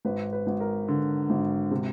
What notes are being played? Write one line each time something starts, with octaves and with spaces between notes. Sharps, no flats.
G#1 B4
B4
G#1
A#4
D3
G#1
C3